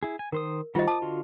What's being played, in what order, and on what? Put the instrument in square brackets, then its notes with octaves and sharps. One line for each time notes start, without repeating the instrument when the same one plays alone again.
[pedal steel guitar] E4 G#4
G#5
[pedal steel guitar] D#3 C5 D#6 [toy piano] A#4
[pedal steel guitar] D#3 G3 F#4 [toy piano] F4 C5 D#5
[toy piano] A5 [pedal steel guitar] D6 D#6
[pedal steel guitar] D3 F4 F#4